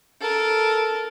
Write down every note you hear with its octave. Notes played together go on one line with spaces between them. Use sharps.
A4 A#4